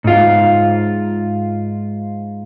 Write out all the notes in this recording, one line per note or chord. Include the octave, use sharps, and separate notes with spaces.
G#2 F4